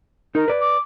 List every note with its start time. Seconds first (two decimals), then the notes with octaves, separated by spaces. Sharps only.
0.35 D#4 A#4
0.48 B4 D5
0.61 D6